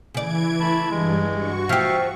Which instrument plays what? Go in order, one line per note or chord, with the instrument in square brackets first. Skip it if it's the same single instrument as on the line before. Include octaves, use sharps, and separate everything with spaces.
[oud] C#3 D5 [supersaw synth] E3 G#6 D7
[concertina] A3 A5 B5
[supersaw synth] G2 [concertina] G#3
[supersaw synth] F#4 C#6
[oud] F3 G4 [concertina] E5 F5